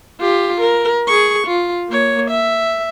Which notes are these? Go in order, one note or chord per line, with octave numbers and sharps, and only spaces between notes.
F4 G4
A#4
G#4 C#6
F4
A#3 C#5
E5